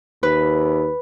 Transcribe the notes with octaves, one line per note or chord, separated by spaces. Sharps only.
D#2 B4